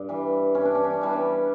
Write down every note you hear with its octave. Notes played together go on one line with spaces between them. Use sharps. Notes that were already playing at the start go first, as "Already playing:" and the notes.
Already playing: G2
E3 G3
G2 C#4
D4
C#4
D4
C#4
E3 G3 D4
C#4